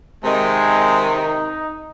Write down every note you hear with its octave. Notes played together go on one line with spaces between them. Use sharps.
C3 D#3 G#3
D#4